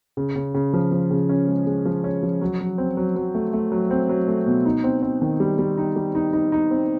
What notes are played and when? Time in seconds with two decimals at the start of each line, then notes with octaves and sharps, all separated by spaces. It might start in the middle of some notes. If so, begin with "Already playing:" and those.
0.17 C#3
0.36 C#3
0.54 C#3
0.73 F3
0.92 F3
1.11 C#3
1.29 C#4
1.48 G#3
1.67 G#3
1.85 F3
2.04 C#4
2.23 F3
2.41 F#3
2.60 F#3
2.78 C4
2.97 F#3
3.16 F#3
3.35 A3
3.53 A3
3.72 F#3
3.91 C4
4.09 F#3
4.28 A3
4.46 B2
4.65 D#4
4.84 C4
5.02 C4
5.22 D#3
5.40 G3
5.59 G3
5.78 D#4
5.96 G3
6.15 D#4
6.33 D#4
6.52 D#4
6.71 C4